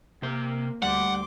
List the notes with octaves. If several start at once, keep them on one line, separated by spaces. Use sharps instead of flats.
C3 A#3 C5
D2 G3 F#5 C6 D6